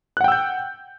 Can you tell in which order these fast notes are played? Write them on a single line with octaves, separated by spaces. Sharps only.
F#6 F#5 G5 E6 G6